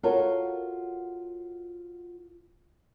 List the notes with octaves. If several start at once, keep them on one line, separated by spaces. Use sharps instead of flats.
F4 F#4 A4 A#4 C#5 F5